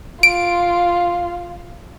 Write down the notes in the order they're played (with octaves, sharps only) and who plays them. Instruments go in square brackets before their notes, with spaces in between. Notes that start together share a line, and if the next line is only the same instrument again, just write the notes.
[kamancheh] F4 [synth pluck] D7